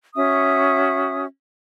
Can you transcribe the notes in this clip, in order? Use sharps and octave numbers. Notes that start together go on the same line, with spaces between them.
C#4 F#4 E5 D#6